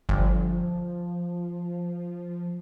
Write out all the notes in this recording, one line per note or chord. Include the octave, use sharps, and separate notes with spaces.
G1 F3